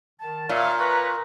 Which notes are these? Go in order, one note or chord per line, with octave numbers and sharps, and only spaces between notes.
D#3 A5
A#2 C#5 E5 F5
B4 A#5 C#6